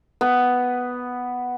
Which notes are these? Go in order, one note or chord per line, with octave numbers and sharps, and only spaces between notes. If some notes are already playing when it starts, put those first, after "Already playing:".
B3